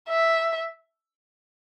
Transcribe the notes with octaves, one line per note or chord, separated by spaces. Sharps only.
E5